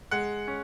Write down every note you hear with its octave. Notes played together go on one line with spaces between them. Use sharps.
G#3 F#5
C#4